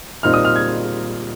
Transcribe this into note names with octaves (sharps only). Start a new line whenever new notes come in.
A#2 G3 C4 D#4 F6
D#6
F6
G#6